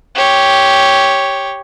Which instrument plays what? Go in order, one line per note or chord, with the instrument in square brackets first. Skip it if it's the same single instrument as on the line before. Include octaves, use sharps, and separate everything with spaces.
[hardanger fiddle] G4 C#5